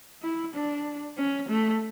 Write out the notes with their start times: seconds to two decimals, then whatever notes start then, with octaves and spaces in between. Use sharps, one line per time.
0.22 E4
0.54 D4
1.17 C#4
1.48 A3